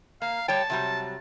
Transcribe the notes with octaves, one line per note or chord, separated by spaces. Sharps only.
A#3 F5
G3 C#5 G5 A5
C3 F#3 G3